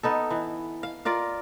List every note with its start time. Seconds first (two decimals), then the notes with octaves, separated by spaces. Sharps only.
0.03 B3 D#4 A4
0.30 E3
0.83 F5
1.05 F4 A#4 D5 F5